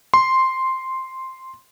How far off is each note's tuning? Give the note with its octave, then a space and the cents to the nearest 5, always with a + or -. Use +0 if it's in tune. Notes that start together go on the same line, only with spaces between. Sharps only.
C6 +0